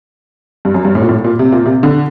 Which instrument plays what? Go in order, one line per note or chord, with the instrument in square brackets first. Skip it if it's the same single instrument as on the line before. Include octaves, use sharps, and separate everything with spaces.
[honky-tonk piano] G2
F#2
G2
A2
A#2
A2
A#2
C3
A#2
C3
D3